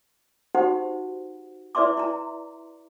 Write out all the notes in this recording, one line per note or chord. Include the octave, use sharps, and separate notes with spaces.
D#4 F#4 G4 C5 F#5
E4 B4 D5 E5 C6 D6
E4 A#5